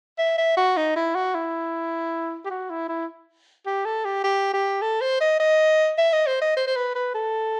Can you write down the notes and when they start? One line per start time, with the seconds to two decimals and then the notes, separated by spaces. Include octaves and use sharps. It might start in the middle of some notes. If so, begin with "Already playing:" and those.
0.18 E5
0.38 E5
0.57 F#4
0.77 D#4
0.96 E4
1.15 F#4
1.35 E4
2.45 G4
2.50 F#4
2.70 E4
2.89 E4
3.66 G4
3.85 A4
4.05 G4
4.24 G4
4.54 G4
4.82 A4
5.01 C5
5.21 D#5
5.40 D#5
5.98 E5
6.13 D#5
6.27 C5
6.42 D#5
6.57 C5
6.67 C5
6.76 B4
6.95 B4
7.15 A4